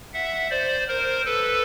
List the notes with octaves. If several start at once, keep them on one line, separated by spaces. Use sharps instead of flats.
E5 F#5
C5 D5
A#4 C5
A4 B4